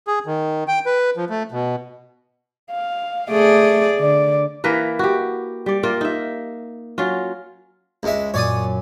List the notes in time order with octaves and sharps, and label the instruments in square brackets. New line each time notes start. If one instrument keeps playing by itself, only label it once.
[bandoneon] G#4
D#3
G5
B4
F3
A3
B2
[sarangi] F5
[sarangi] A3 [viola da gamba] G#4 D5
[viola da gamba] D3 [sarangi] D5
[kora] E3 A#3 A#4 B4
F#4 G4
G3 D5
A#3 F4
D#4 E5
F#3 C#4 F4
[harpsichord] C#2 G#3 E5
[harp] F#2 A#2 [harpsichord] C#5 D5 D#6